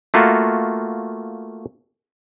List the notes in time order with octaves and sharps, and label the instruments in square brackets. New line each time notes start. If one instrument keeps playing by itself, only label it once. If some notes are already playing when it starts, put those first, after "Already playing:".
[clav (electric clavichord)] A3 A#3 F4 F#4